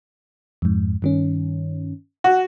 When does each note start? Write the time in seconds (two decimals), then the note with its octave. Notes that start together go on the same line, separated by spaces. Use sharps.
0.62 F2 G#2
1.02 G2 D#3 C#4
2.24 F#4